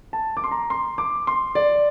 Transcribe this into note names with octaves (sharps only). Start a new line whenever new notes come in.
A5
D6
C6
A#5
C6
D6
C6
D5